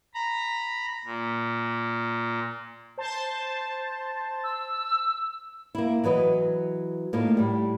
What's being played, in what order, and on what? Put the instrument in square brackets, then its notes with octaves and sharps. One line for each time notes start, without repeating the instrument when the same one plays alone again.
[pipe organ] A#5 B5
A#2
[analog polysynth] C5 A5
[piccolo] E6
[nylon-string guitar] A#3 E4
E3 F#3 B4 D#5
A2 A#3 D#4 F4
A2 G3